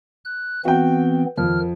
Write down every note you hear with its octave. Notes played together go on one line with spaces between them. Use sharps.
F#6
E3 B3 C4 F#4 G5
F2 D#3 F6